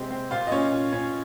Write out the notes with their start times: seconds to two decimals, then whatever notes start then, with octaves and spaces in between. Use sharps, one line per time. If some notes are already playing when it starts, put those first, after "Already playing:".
Already playing: C3 G#3 C4 G4
0.11 C4
0.31 A#2 F4 F5
0.47 D#5
0.52 A#2 C#4 C#5
0.73 A#2
0.93 A#2 C#4 C#5